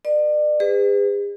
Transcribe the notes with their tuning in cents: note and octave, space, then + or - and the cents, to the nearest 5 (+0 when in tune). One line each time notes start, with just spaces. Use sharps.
B4 -30 D5 +35
G#4 -45 B4 +35